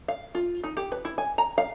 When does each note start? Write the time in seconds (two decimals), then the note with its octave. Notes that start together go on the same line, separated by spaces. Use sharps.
0.08 F5
0.35 F4
0.64 D#4
0.77 G4
0.92 B4
1.05 E4
1.18 G#5
1.38 A#5
1.58 F5